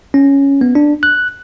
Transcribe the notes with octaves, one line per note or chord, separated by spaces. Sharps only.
C#4
B3
D4
F#6